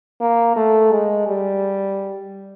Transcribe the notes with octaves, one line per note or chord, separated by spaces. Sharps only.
A#3
A3
G#3
G3